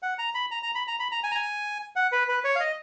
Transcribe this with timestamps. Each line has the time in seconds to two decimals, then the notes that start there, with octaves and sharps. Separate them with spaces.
0.03 F#5
0.19 A#5
0.34 B5
0.51 A#5
0.63 A#5
0.75 B5
0.87 A#5
1.00 B5
1.12 A#5
1.24 G#5
1.31 A#5
1.35 G#5
1.96 F#5
2.12 B4
2.28 B4
2.44 C#5
2.56 F5
2.60 D#5